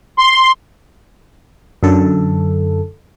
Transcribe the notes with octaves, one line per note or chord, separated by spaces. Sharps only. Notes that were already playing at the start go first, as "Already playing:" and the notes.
C6
F#2 D3 A4